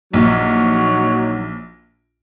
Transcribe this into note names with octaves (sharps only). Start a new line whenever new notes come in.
A#1 F#3 D#4